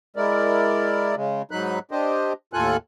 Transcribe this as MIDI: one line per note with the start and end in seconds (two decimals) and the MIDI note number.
0.16 1.15 56
0.16 1.15 64
0.16 1.15 70
0.16 1.15 74
1.16 1.42 49
1.16 1.42 56
1.51 1.79 44
1.51 1.79 54
1.51 1.79 63
1.51 1.79 83
1.51 1.79 90
1.91 2.33 62
1.91 2.33 67
1.91 2.33 72
1.91 2.33 75
2.53 2.77 39
2.53 2.77 45
2.53 2.77 65
2.53 2.77 69
2.53 2.77 80
2.53 2.77 90